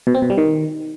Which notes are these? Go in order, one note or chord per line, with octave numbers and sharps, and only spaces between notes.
B2
C4
B2
G3
D#3